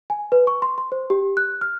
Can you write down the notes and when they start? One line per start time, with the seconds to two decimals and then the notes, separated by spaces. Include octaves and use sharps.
0.10 G#5
0.32 B4
0.47 C#6
0.62 C6
0.78 C6
0.92 C5
1.10 G4
1.37 F#6
1.61 F6